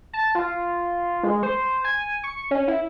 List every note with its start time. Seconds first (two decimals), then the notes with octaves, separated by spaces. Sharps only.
0.13 A5
0.35 F4
1.23 G#3
1.43 C5
1.84 G#5
2.23 C#6
2.51 C#4
2.68 E4